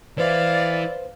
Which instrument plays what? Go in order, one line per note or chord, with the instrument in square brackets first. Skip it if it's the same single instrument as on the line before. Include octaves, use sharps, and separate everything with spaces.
[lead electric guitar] E3 E4 [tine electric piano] B4 C5 [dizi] D5 [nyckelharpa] F5